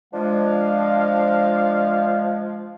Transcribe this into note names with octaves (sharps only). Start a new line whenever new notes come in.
F3 G#3 D4 F5